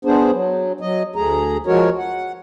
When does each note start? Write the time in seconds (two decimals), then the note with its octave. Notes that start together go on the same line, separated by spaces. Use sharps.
0.05 B3 D4 G#4 C5
0.33 F#3
0.81 F#3 D#5
1.16 D2 A3 G#4 A#5
1.67 F3 G#3 F#4 A#4 C#5
1.98 F#5